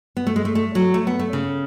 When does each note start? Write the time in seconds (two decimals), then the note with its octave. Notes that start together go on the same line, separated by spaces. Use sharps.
0.17 B3
0.27 A3
0.36 G#3
0.45 A3
0.55 A3
0.75 F#3
0.94 A3
1.07 B3
1.19 A3
1.33 C#3